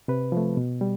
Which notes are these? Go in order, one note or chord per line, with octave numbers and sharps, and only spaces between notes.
C3 B4
F3 A3
B2
G3